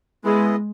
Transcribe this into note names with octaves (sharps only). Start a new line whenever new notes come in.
G#3 B3 E4 G#4 D#5